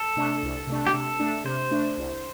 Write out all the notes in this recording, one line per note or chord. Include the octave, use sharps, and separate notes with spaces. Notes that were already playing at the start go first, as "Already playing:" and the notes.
Already playing: A4
C3 A3 D4
C2
C3 A3 D4
G4
C3 A4
A3 D4
C3 C5
A3 D4
C2